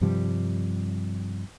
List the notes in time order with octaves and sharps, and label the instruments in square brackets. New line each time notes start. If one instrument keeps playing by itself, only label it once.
[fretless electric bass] G2 C3 F3 G3